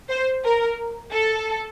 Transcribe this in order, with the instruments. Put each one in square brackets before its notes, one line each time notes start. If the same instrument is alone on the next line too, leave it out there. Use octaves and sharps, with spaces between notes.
[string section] C5
A#4
A4